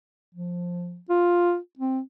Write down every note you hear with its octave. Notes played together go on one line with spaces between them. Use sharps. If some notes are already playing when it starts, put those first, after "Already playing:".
F3
F4
C4